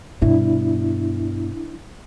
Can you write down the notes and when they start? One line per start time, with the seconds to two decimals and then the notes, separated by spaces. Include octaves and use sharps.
0.22 G2 B2 D4 E4